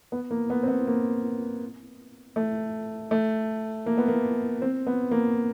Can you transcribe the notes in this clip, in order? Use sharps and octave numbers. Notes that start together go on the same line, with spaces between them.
B3
A#3
B3
C4
B3
A#3
A3
A3
A#3
B3
A#3
C4
B3
A#3